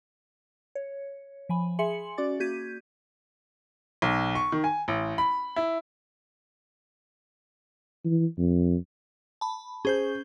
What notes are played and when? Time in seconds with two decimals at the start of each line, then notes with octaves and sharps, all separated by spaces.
0.75 C#5
1.49 F3 G#5 B5
1.79 G#4 E5 G#5 C6 C#7 F#7
2.18 C#4 F#4 D5 D6 A6
2.40 A#3 F#4 G6 G#6 B6 D#7
4.02 B1
4.35 C#6
4.52 D#3
4.64 G#5
4.88 A1
5.18 B5
5.56 E4
8.05 E3
8.38 F2
9.41 A5 B5
9.85 C#4 G#4 C5 G6